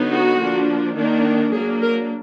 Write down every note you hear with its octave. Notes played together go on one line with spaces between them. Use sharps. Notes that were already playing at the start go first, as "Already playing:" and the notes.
Already playing: D3 F#3 B3 D#4
F#4
F3 A#3 D4
D#3 A#3 D4
F#3 A#3 D4 G#4
A#4